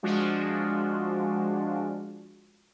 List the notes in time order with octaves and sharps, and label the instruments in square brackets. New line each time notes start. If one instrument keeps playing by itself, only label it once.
[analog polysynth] F3 G#3 D4 F4 F#4